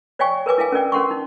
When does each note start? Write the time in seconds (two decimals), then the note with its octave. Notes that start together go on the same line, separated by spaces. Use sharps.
0.19 C#5 D5 F5 G5 G#5 C#6
0.46 A#4 B4 G#5 D6
0.58 E4 A#4 F5 G#5
0.72 C#4 A#4 D5 G5
0.92 C#4 A#4 F#5 C6 C#6
1.11 D#4